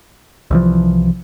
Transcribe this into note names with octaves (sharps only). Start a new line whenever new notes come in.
C2 E3 F3